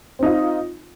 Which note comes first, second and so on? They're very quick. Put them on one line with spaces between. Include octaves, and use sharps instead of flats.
C4 D#4 F4